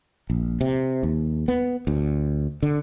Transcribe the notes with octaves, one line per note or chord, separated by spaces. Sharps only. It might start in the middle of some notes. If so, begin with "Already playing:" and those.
A#1
C3
D#2
B3
D2
D3